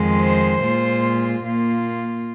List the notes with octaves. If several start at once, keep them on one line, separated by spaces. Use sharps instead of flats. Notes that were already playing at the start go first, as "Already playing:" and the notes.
Already playing: F2 D#3 G#3
C5
A#2 G#3 F4
A#2 A#3 F4